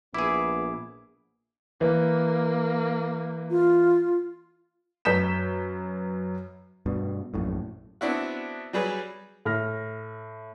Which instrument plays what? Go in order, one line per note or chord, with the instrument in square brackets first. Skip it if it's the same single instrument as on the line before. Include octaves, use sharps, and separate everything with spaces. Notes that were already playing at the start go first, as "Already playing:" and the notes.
[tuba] A#1 [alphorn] B3 [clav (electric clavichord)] E4 G#4 [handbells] D6
[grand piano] E3 [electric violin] A#3
[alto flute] F4
[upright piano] F#2 B4 G6 B6 E7
[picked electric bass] G2 B2
A#1 F#2 A2
[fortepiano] B3 C4 D4 E4 F#4
F#3 G3 G#4 B4
[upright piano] A2 F6 A#6